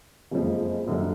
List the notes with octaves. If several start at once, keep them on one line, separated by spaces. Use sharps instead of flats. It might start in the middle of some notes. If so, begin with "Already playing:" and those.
F#1 F2 C#3 F3 G#3
F#1 F#2 D3 G3